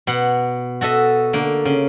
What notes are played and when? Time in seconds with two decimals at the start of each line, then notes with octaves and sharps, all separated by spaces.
0.07 B2 F#5
0.81 F#4 A4 D#5 E5
1.33 D3 A#3
1.65 C#3